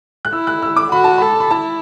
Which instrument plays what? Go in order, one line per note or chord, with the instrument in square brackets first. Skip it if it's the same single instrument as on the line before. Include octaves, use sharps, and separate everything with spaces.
[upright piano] F#6
[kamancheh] E4 [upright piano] E6
[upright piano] F#6
E6
D6
[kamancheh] F#4 [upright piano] B5
[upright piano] A5
[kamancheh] A4 [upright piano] B5
[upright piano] B5
[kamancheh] E4 [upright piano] A5